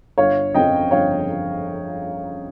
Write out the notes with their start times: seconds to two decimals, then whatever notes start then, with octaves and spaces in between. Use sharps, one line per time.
0.18 G1 C#5 F5
0.54 F2 C#3 F3 C4 D#5 G5
0.91 G1 C#5 F5